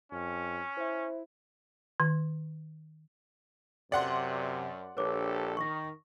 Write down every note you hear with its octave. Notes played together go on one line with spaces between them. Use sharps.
F2 C#4
E4 C5 E5
D#3
F#2 C3 D5 F#5 C6
A#1 D4 G4 A4 B4 C#5 D6
D#3 C#6 A#6